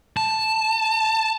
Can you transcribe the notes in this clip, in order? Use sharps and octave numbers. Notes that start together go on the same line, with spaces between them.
A5